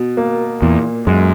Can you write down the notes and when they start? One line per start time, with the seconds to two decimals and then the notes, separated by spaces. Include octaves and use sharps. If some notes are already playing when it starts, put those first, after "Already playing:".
Already playing: B2
0.17 A#3
0.62 E2 A#2
1.07 F#2 G#3